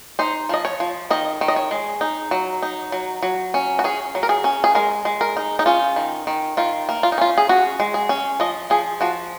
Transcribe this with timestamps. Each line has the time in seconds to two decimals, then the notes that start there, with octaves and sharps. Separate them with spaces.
0.19 D#4 C5
0.49 F3 D#5
0.65 C#5
0.80 F3
1.10 D#3 D#5
1.41 D#3
1.48 D#5
1.56 C#5
1.71 G#3
2.01 D#4
2.31 F#3
2.62 D#4
2.92 F#3
3.22 F#3
3.54 C#4
3.79 F#4
3.84 C#4 G#4
4.15 F#3
4.23 A#4
4.29 G#4
4.44 C#4
4.64 G#4
4.75 G#3 A#4
5.05 G#3
5.21 A#4
5.37 D#4
5.59 D#4
5.66 C#4 F4
5.96 D#3
6.27 D#3
6.57 D#3 F4
6.89 A#3
7.03 F4
7.12 D#4
7.18 C#4 F4
7.38 G#4
7.49 C#4 F#4
7.80 G#3
7.94 G#4
8.09 C#4
8.40 F3 D#5
8.70 F3 G#4
9.01 F3 F#4